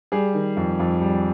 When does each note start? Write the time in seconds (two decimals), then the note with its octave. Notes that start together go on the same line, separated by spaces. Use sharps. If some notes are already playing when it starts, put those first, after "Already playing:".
0.12 G3 G#4
0.34 D#3
0.57 F2
0.80 F2
1.02 G3